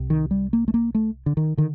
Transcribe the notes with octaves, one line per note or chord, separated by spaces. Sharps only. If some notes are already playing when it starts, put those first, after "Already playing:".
Already playing: C2 C3
D#3
G3
A#3
A3
A#3
A3
D3
D#3
D3 D#3